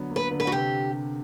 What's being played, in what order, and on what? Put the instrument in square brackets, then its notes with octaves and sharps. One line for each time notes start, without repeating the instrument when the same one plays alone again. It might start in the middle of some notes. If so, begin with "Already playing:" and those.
Already playing: [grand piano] D3 F#3 B3
A#3
[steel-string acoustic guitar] B4
[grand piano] D3
[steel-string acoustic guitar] B4
F#4
[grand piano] C3 [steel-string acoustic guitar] G4